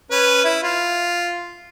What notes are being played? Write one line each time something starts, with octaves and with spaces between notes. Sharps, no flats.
C#4 B4
E4
F4